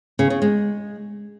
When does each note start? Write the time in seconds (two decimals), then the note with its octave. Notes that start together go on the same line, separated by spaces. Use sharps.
0.19 C#3
0.30 C#3
0.42 G#3